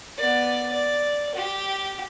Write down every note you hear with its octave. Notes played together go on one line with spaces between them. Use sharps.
B3 D5
D5
G4